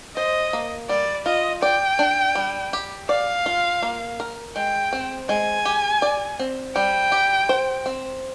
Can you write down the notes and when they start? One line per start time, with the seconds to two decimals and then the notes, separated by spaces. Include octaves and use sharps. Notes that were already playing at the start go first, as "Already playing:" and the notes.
0.16 C5 D#5
0.53 A#3
0.89 G3 D5
1.26 F4 D#5
1.62 D5 G5
1.99 D4
2.35 G3
2.73 G4
3.09 D5 F5
3.46 F4
3.83 A#3
4.20 A#4
4.56 G#3 G5
4.93 C4
5.29 G#3 G#5
5.65 G4
6.02 D5
6.39 C4
6.76 G3 G5
7.12 G4
7.49 C5
7.86 C4